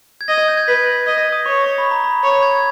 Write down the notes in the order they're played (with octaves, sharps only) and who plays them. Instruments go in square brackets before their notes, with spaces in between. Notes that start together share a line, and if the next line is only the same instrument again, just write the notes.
[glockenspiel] G#6
[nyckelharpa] D#5 [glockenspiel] A#6
[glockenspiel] G6
G#6
[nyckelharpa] B4 [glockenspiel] B6
[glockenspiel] A#6
[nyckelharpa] D#5 [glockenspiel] G#6
[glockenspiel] D#6
[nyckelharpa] C#5 [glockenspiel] C#6
[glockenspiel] C#6
B5
A#5
B5
[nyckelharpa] C#5
[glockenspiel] G#6